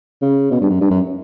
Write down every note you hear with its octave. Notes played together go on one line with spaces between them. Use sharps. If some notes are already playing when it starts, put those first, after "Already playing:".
C#3
B2
G2
F#2
G2
F#2